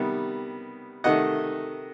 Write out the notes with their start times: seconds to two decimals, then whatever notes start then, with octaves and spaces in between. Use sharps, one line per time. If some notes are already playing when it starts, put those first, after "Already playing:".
Already playing: C3 D#3 G3 B3
1.04 C3 D#3 A3 D#5 F#5